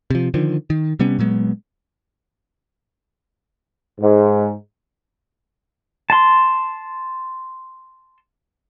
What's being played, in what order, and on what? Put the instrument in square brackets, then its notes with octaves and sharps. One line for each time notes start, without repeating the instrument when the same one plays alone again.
[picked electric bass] C3 F3
D3 D#3 F3
D#3
C3 G3 B3 C#4
A#2 F#3 G#3 B3
[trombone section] G#2
[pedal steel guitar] A5 C6